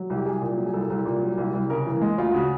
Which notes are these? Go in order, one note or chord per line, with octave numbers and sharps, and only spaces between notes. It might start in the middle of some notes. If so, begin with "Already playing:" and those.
Already playing: F#3
C2
G4
C2 G#4
A#2
F#3
G#4
C2 A4
C2
A#2
F#3
C2
C2
C#3 A#4
E3
G#3
D2 F4
C#3 F#4